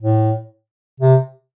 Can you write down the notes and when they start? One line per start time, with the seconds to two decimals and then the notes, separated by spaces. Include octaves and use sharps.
0.02 A2
1.00 C3